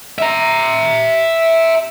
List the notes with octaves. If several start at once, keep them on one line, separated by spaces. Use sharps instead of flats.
E5 A#5